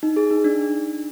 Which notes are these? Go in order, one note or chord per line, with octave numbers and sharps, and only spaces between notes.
D#4
G#4
D#4
D4